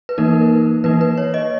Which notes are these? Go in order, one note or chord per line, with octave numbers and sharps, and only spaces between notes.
B4
E3 A#3 D#4 A#4
E3 A#3 D#4 B4
B4
C#5
D#5